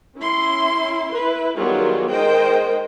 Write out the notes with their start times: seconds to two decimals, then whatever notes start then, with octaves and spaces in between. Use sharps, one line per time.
0.17 C#4 E4 C6
1.16 E4 B4
1.57 D#3 F#3 G3 B3 F4 G#4
2.10 D#3 G#3 A#4 C5 D#5 G5